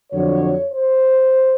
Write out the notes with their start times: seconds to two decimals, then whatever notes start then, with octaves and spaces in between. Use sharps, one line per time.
0.12 F2 D3 F#3 C#5
0.71 C5